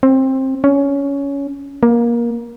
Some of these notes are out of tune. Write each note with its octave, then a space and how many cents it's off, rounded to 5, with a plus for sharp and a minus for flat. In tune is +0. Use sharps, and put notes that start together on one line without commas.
C4 +20
C#4 +15
A#3 +20